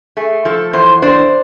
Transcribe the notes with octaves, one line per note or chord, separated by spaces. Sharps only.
A3 G#4
F3 A4
E2 C5
D4 C5